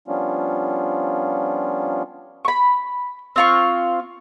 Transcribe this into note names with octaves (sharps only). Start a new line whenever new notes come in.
F3 G3 B3 C#4 D4 F4
B5 C#6
C4 F4 C#6